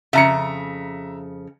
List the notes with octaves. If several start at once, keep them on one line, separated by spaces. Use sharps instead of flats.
F2 C#3 E5 A#5 C#7